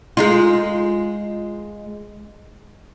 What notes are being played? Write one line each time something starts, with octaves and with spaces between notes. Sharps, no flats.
G#3 D#4 F4